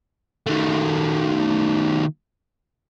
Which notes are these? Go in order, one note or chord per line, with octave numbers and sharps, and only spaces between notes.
D#3 A3